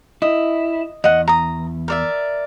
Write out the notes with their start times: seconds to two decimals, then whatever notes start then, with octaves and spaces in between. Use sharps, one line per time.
0.22 E4 D#5
1.04 E2 D#5 F#5
1.28 A#5 D#6
1.88 A#4 D5 E5